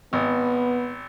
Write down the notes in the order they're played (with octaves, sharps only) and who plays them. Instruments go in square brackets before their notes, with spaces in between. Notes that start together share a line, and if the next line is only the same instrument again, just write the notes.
[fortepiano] G#1 [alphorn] B3